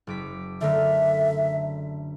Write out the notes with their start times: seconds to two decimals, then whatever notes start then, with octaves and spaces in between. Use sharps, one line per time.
0.07 F#1 D6 B6
0.61 D3 A3 A#4 E5